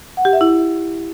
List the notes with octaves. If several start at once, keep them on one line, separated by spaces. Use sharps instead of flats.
F#5
G4
E5
E4